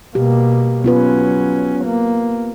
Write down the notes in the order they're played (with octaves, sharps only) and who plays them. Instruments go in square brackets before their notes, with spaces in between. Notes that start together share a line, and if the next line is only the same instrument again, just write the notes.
[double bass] B2 A#3 [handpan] G4
[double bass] F#3 C#4 [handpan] B3 F4 B4
[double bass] A#3